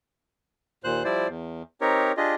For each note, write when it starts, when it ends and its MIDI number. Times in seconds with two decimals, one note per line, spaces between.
0.84 1.03 39
0.84 1.03 46
0.84 1.03 72
0.84 1.03 90
1.05 1.28 53
1.05 1.28 55
1.05 1.28 64
1.05 1.28 72
1.05 1.28 74
1.28 1.62 40
1.81 2.12 60
1.81 2.12 63
1.81 2.12 67
1.81 2.12 70
1.81 2.12 73
2.17 2.35 62
2.17 2.35 65
2.17 2.35 67
2.17 2.35 68
2.17 2.35 75